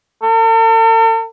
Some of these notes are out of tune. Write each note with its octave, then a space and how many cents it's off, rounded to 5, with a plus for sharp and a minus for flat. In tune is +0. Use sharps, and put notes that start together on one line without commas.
A4 +45